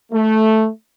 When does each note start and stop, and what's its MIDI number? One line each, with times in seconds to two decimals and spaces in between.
0.12 0.68 57